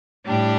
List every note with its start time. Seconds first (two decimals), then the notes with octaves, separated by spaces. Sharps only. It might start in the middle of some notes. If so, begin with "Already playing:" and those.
0.25 A2 G3 D4 G4